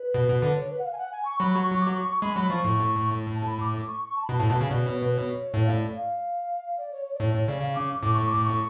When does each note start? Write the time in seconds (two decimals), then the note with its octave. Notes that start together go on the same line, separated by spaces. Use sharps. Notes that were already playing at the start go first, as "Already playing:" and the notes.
Already playing: B4
0.14 B2
0.29 B2
0.42 D3
0.56 C#5
0.70 B4
0.79 F#5
0.84 F5
0.93 G#5
0.98 F#5
1.12 G#5
1.25 C#6
1.39 F#3 B5
1.53 C#6
1.67 C#6
1.81 D6
1.94 C#6
2.08 C#6
2.22 G#3 B5
2.36 F#3 B5
2.50 F3 C#6
2.64 A2
3.36 A5
3.47 B5
3.60 D6
3.88 C#6
4.02 C#6
4.16 A5
4.25 B5
4.29 B2 A5
4.40 A2
4.43 A5
4.50 B2
4.57 C#3 G#5
4.70 B2 D5
4.84 C#5
4.99 B4
5.13 C#5
5.54 A2 C#5
5.65 F5
5.75 D5
5.95 F5
6.78 D5
6.92 C#5
7.06 C#5
7.14 D5
7.20 A2 C#5
7.34 A2 C#5
7.47 C#3 D5
7.61 C#3 F5
7.75 D6
8.01 A2 D6
8.14 C#6
8.26 D6
8.44 C#6